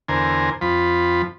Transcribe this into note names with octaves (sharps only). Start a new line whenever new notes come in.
E2 D3 A#4 C5 G#5
F2 F3 B5